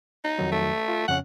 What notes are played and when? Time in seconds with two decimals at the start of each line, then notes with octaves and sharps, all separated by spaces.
0.24 D#4
0.39 F2 D#3 F#3
0.52 A3
0.88 F4
1.08 F2 C#3 C#4 F#5